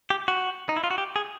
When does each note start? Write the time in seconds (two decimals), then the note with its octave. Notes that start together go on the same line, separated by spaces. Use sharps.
0.10 G4
0.28 F#4
0.69 D#4
0.76 E4
0.84 F4
0.91 F#4
0.98 G4
1.16 G#4